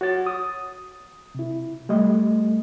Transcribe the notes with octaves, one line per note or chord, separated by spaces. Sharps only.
F#4 C#5 A6
D#6
C3 E4
G3 A3 D#5